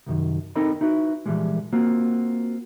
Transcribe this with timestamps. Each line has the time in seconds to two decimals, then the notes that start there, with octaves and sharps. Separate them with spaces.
0.07 C2 F#2 D#3
0.55 C4 D#4 A4 A#4 D#5 B5
0.81 D#4 E4 F#4 B4
1.26 A#2 E3 F3 G3 G#3
1.73 A#3 C4 F4 F#4